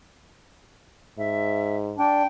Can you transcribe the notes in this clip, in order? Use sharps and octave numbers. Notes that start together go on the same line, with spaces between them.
G#2 E5
D4 G5